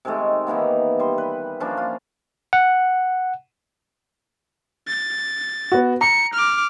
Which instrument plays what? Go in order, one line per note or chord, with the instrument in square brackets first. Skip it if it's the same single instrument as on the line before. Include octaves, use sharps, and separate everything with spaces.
[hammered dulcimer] C3 D#3 G#3 A3
D#3 E3 A#3 B3
G3 C6
B4
F3 A#3 C#4 D4
F4
[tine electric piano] F#5
[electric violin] A6
[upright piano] B3 F#4
[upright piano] A#5 [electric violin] C#7
[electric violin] D6 F6